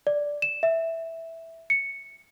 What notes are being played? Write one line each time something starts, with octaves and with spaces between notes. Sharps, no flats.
D5
E7
E5
C#7